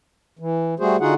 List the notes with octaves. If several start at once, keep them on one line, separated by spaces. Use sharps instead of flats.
E3
G3 A3 F#4 G#4 C5
D3 D#4 F4 F#4 G#4 F#5